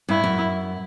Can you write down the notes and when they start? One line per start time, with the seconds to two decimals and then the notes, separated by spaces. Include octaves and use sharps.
0.09 G2 E4
0.24 F#2